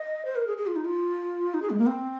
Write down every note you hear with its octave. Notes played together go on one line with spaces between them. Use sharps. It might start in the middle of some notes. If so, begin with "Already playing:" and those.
Already playing: D#5
C5
A#4
G#4
G#4
F4
D#4
F4
D#4
G#4
G#3
A#3
C4